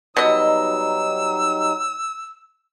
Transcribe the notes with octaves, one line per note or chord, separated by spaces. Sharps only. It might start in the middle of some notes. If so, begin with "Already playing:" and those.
B2 F#3 G3 D#4 D#5 E6